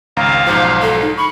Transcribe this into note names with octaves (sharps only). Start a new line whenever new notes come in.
G#1 C#2 F5 A#5
B1 G#2 F3 C5
A4
D#4
B5 C#6